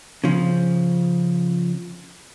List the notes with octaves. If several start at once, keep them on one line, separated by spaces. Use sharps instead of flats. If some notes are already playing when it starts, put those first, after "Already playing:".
C#3 F3